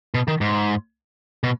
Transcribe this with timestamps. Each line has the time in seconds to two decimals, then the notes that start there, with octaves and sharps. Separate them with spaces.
0.14 B2
0.28 D#3
0.41 G#2
1.43 B2